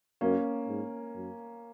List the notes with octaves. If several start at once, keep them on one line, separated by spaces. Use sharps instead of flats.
F#2 A#3 C#4
G#2
F#2